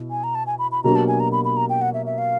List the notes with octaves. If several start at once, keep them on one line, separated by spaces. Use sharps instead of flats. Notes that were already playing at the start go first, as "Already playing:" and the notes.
Already playing: B2 E4
G#5
A#5
A5
G#5
B5
B5
B2 F#3 A#3 D4 G4 A#5
A5
G#5
A#5
B5
B5
A#5
G5
F#5
E5
E5
F5